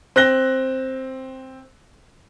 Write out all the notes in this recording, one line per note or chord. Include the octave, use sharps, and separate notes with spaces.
C4 F#6 A#6 G7